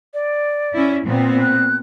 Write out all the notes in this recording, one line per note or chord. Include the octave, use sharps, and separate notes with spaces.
D5
C#4 E4
A#2 B3 C4
F#6